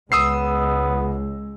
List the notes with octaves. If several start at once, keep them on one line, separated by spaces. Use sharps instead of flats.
C#2 G#3 B3 D#6 E6 C7